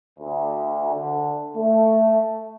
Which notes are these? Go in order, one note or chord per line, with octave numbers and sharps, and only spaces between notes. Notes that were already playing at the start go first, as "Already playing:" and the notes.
D2
D3
A3